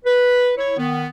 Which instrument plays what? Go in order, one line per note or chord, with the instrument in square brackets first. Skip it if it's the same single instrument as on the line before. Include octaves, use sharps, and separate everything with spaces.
[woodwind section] B4
E4 C#5
D#3 B3